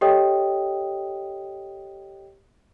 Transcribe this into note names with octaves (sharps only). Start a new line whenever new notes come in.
G4 A4 C#5 D#5 G5 D#6